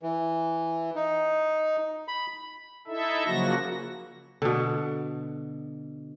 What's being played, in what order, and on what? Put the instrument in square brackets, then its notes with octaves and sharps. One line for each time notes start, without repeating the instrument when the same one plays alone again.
[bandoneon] E3
D#4
B5
[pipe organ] D#4 E4 A4 E5
C#3 F3 F#3 A#3 F#4 A#6
[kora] B2 D3